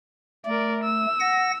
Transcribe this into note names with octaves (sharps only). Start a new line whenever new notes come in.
A3 A#4 D5
E6
F#5 A#6